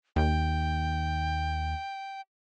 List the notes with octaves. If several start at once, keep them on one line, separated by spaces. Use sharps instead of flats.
D#2 G5